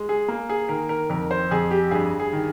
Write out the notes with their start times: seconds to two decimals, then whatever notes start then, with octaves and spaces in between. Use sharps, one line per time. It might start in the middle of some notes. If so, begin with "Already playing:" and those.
Already playing: G#3
0.09 G#4
0.28 A#3
0.49 G#4
0.69 D#3 A#4
0.89 A#4
1.10 F2 A#4
1.31 C5
1.51 F2 G#4
1.71 G4
1.91 G2 G#4
2.20 G#4
2.33 D#3